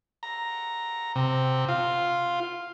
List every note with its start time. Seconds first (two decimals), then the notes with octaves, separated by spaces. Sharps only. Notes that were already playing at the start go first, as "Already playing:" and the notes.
0.23 A#5
1.15 C3
1.68 F4